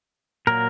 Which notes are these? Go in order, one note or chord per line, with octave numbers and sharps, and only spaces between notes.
A#2 F#3 A#3 A#4